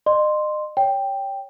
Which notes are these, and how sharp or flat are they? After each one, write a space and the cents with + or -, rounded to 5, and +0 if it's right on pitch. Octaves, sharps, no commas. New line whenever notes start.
D#5 -35 C6 +0
C#5 +20 G5 +0